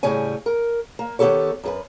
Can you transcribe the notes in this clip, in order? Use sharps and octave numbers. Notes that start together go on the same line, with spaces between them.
A2 C#3 G3 C#5 G#5
A#4
A#3
D#3 B3 F4 G4 A4 C#5
F#2 G#4 B4